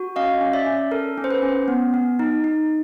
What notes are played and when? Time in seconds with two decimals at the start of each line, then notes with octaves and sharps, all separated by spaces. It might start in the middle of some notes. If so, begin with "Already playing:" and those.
Already playing: F#4
0.16 C#4 D#5 F5
0.41 C#4
0.53 D5 E5
0.67 C#4
0.91 A4 A#4
1.18 C#4
1.24 C5
1.31 B4
1.42 C#4
1.68 B3
1.94 B3
2.19 D#4
2.44 D#4